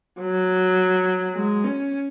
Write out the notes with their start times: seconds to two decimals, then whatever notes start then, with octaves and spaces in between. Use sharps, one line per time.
0.20 F#3
1.35 G#3
1.64 C#4